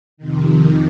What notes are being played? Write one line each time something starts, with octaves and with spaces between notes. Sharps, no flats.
F2 C3 D#3